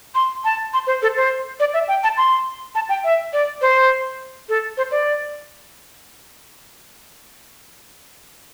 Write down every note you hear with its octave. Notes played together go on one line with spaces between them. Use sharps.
C6
A5
C6
C5
A4
C5
D5
E5
G5
A5
C6
A5
G5
E5
D5
C5
A4
C5
D5